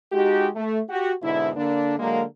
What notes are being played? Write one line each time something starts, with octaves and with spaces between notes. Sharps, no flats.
G#3 D#4 F#4 G4
A3
F#4 G4
G#2 B2 D3 E4
D3 A#3 D4
D3 F#3 G#3 A#3